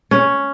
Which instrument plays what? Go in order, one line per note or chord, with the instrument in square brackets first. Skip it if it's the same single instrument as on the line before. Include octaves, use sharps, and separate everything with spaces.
[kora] C#4